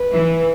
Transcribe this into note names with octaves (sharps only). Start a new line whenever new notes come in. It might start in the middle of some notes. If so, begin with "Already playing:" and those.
Already playing: B4
E3